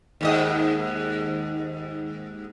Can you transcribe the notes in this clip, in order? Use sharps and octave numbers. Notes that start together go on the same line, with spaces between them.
D#2 G#2 D#5